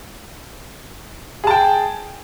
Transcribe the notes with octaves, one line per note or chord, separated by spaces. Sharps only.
G#4 G5 A5